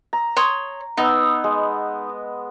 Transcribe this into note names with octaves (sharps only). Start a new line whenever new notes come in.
A#5
C#5 C6 D#6
B3 D#4 D#5 E6
G#3